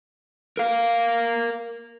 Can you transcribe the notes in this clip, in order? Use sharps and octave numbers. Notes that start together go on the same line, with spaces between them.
A#4 F5